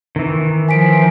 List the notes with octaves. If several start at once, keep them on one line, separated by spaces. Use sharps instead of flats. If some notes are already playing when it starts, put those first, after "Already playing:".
D#3 E3
F3 G#5 B6 D7